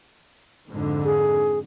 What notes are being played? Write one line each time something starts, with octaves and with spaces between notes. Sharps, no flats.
F2 G#2 D3
G#4